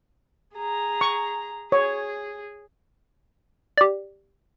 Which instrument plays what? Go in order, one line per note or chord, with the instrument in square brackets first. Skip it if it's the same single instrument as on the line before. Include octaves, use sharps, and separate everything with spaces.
[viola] G#4 A#5
[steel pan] C#6
[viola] G#4 [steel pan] C#5
[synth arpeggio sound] G4 D5